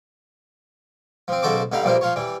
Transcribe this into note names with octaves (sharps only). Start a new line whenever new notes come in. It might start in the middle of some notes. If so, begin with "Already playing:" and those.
F3 C4
B1 C#3 F#4 A4 C5 D6
G2 D3 D#4 F5 B5
A#1 G2 F3 G3 A#3 C5
F3 F4 C#5
E3 G3